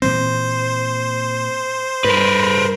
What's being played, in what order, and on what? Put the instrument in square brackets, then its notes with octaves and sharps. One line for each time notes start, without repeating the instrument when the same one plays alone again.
[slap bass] A#2 E3 C4 [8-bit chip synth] C5
[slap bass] G2 [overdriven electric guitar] A#4 B4